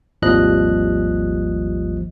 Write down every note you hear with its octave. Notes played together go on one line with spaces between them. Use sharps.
G#1 D#2 F3 G3 D#5 F#6